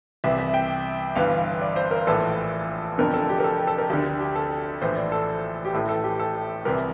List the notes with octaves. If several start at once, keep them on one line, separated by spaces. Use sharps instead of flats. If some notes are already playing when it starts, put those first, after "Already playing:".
C2 C3 E3 E5
E5
G5
G1 G2 E3 F5
D5
C5
A#4
A#1 A2 E3 A4
F1 F2 D3 A#4
A4
G4
A#4
A4
A4
A#4
D2 D3 G4
G4
A4
A#1 A2 E3 C5
D5
A4
G4
A1 A2 E3 A4
A4
G4
A4
C2 C3 E3 A#4